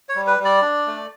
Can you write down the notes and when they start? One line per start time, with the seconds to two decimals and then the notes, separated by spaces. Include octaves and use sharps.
0.09 C#5
0.16 G3
0.27 B4
0.39 G3
0.45 D5
0.62 D4
0.87 A3